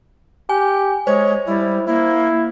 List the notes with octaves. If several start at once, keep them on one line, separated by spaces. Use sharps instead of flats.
G4 G#5
G#3 C5 C#5
G3 E4
A#3 E4